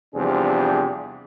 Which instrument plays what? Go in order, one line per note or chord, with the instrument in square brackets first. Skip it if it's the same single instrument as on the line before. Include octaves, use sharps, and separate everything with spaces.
[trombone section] E2 C3 F3 G3 D4 G#4